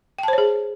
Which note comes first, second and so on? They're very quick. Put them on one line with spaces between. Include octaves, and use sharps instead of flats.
G5 A5 C5 C#5 G#4